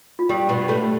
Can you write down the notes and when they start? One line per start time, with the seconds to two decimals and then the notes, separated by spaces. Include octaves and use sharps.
0.19 F4
0.29 G2 G3 G4
0.49 B2 B3
0.68 A2 A3